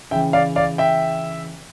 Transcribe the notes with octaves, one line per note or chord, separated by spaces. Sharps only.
C#3 E3 E5 G5
D5 F5
D5 F5
E5 G5